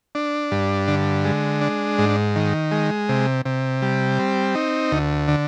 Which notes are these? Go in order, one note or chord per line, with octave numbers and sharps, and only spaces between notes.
D4
G2
D3
G#3
D4
G#2
D#3
G#3
C3
C3
G3
C4
D#4
D2
D3